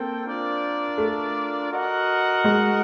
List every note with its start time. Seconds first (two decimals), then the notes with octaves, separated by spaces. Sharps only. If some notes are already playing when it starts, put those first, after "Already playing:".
Already playing: A#3 C4 A4 G5
0.25 D4 F4 A#4 D5
0.98 A3
1.71 F#4 A#4 D#5 F#5
2.44 G#3